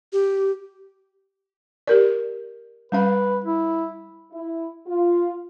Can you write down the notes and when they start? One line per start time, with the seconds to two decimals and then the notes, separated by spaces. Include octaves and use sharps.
0.13 G4
1.87 G4 A#4 D5
2.92 G3 C#4 B4 F5
3.44 E4
4.32 E4
4.87 F4